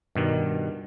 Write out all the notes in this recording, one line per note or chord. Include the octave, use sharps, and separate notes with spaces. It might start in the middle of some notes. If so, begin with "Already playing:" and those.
G2 B2 D#3